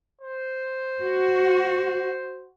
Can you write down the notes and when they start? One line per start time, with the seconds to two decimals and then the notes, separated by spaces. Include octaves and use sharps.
0.21 C5
1.01 F#4